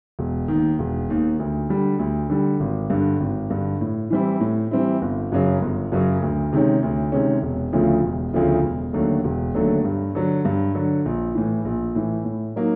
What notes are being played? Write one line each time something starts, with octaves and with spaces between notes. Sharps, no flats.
E1
D#3
D#2
E1
D#2 D#3
D2
D3 G3
D2
D3 G3
G#1
G2 D3
G#1
G2 D3
A2
E3 G3 C4 E4
A2
E3 G3 C4 E4
G1
F#2 C#3 F#3
G1
F#2 C#3 F#3
D2
C3 D#3 G#3 C#4
D2
C3 D#3 G#3 C#4
E1
D2 C#3 F3 A3
E1
D2 C#3 F3 A3
E1
D#2 D3 F#3 A3
E1
D#2 D3 F#3 A3
G2
D3 F#3
G2
D3 F#3
A#1
A2 E3
A#1
A2 E3
A2
F#3 A#3 D#4